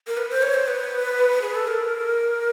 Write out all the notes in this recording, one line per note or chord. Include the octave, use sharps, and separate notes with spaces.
A#4
B4
C5
C#5
C5
B4
G#4
A4
A#4